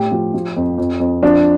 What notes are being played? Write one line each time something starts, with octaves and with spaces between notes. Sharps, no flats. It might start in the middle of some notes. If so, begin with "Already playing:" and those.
Already playing: A2 G4
F3
F3
F2
F2
F2
F3 D4